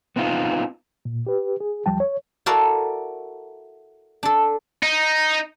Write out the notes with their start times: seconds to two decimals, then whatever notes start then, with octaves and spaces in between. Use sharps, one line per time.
0.16 B3 C4 D#4 F4
1.05 A#2
1.27 G4 B4
1.60 G#4
1.86 D#2 F3 G3 G5 A5
2.00 C#5
2.46 E4 F#4 A4 A#4 D5 F5
4.23 D4 A4
4.83 D#4